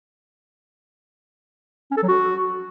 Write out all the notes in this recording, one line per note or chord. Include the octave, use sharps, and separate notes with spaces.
C#4
A4
F#3
F#4